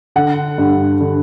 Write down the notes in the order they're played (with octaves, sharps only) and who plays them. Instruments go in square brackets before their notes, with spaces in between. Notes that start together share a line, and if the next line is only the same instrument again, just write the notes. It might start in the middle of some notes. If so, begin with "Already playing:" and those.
[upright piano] D3 F#5
G2
D3